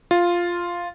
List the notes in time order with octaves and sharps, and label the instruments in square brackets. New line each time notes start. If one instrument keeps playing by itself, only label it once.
[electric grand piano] F4